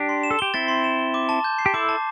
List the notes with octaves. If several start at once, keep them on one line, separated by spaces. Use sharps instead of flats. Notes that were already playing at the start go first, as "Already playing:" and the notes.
Already playing: D4 G4
C6
E7
A4
G4 G7
C4 E4 A6
C6
E7
G7
D6
A5
G6
C7
G4
E4 A4 D6
A5